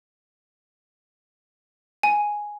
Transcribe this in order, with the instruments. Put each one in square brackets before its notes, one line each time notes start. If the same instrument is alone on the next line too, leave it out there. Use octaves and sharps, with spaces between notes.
[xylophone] G#5